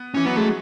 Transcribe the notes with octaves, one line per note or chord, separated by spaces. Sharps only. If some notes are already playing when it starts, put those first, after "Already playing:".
Already playing: B3
E3 C#4
F#3 B3
G#3 A3